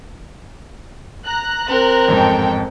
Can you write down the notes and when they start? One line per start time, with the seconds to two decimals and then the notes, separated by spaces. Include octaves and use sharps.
1.26 A#5 F#6
1.67 C4 A#4
2.08 A1 F2 G#2 A4 G5